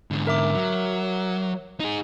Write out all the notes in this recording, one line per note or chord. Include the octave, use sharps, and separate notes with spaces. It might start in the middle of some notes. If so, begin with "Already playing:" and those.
G#2 D3
A#4 E5 D6
F#3
D#4 G#4